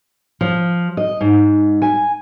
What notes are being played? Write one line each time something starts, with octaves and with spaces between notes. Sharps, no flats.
F3
D#5
G#2
G#5